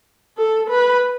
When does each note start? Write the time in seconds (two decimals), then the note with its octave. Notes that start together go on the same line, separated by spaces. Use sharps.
0.38 A4
0.70 B4